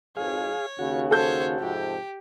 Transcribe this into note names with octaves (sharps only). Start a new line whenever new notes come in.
G#1 F2 G#4 C#5 F5
D#2 C#3 F#4
A4 C5 C#5 G6
F2 G#2 C3 G4